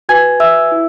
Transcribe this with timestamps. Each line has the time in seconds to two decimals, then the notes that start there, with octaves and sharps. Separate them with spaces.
0.09 F#4 B4 G#5 G#6
0.40 E5 E6
0.72 E4